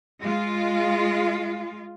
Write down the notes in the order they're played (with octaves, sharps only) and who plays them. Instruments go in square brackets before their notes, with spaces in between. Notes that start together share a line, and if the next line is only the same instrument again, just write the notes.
[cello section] G#3 F4